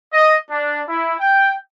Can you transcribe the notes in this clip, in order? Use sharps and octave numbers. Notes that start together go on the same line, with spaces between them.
D#5
D4
E4
G5